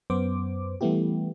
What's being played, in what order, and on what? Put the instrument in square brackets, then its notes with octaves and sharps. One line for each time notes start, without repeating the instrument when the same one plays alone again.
[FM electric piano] F#2 B3 C5 D6
E3 G3 A3 B3 E4 G4